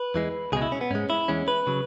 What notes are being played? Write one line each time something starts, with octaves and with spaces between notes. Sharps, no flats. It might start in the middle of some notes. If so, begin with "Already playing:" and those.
Already playing: B4
E2 E3 G#3
C#2 B2 G#3 G#4
E4
C#4
B3
G#2 G#3 C#4
E4
E2 E3 G#3 C#4
B4
C#3 F#3